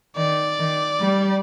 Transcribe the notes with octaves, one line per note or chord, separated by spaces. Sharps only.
D#3 D5
D#3
G3